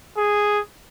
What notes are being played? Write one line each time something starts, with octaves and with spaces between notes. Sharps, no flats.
G#4